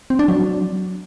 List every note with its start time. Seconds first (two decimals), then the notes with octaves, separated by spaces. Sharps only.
0.10 C4
0.19 D4
0.28 F#3